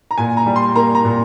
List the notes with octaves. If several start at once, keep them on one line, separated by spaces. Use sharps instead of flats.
A#5
A#2 G#5
A#5
G3
C6
A#3 A#5
A#5
A#2